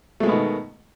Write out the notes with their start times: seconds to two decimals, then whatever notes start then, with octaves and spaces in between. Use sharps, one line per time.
0.20 A3
0.23 G#3
0.26 B3
0.29 B2
0.32 D#3